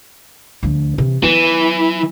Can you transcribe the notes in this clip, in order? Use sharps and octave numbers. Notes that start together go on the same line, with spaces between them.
D2 F3
C3 E3
E3 F#3 B3